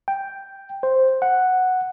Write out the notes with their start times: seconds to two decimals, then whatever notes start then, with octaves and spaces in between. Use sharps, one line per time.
0.08 G5
0.83 C5
1.22 F#5